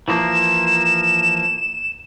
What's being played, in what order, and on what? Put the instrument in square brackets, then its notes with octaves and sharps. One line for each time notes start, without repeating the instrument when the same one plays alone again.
[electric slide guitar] E3 F3 A#3 [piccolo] E7